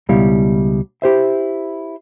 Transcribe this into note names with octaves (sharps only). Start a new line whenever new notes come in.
C#2 B2 G3 E4 F5
E4 G4 C5 E5